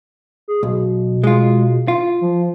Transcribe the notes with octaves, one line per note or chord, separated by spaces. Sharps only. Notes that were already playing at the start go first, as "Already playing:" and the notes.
G#4
B1 B2
G#3 F4
F4
F3